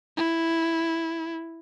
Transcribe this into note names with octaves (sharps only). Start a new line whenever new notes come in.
E4